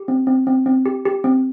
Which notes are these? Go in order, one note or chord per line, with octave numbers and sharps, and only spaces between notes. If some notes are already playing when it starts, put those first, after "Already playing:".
Already playing: G4
C4
C4
C4
C4
G4
G4
C4